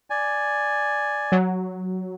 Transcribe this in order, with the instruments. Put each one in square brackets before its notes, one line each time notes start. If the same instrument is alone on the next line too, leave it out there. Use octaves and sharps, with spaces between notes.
[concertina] D5 G#5
[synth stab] F#3